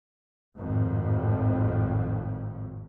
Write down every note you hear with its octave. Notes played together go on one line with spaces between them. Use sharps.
G#1 F2 A2